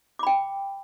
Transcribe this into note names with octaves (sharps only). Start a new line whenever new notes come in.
G5 B5 D6